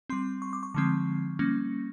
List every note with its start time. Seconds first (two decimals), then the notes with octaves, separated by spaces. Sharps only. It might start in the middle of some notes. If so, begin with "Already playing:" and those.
0.09 G3 C4 C6
0.42 C#6
0.53 D6
0.63 C#6
0.74 D3 F3 G#3 C4
1.39 G3 A#3 C#4